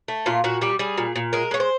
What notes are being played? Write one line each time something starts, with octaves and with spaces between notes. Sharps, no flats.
A3
A#2 F4
A#2 F#4
G3 G4
G3 G#4
A#2
A#2
G#3 A#4
G#3 C#5
C5